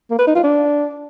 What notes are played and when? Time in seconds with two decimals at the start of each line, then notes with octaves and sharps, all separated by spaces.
0.11 A#3
0.19 B4
0.27 D#4
0.35 F4
0.44 D4